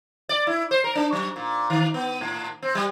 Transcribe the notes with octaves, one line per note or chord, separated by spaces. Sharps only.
D5
E4
C5
A#4
D4
F#3
A#2
D#3
B3
A2
C4
G3